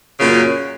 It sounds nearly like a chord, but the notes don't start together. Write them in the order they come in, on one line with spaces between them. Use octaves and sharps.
C#3 F#2 A#2